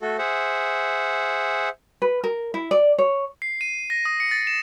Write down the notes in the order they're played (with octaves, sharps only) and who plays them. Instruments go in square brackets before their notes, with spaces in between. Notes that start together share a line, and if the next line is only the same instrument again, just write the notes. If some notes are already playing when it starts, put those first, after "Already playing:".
[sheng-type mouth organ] A3 F#4 A4
G#4 C5 E5 F#5
[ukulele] B4
A#4
E4
D5
C#5
[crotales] C7
D#7
A#6
D#6
C#7
A6
E7